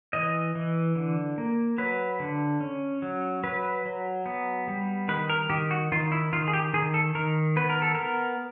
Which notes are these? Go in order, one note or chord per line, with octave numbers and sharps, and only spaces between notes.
E3 D#5
E3
D3
A#3
F#3 B4
D3
C#4
F#3
F#3 B4
F#3
B3
G3
D#3 B4
A#4
D#3 G4
F#4
D#3 F4
E4
D#3 F4
G#4
G4
D#3 G#4
A4
D#3 A#4
B3 B4
A#4
A4
B3 A#4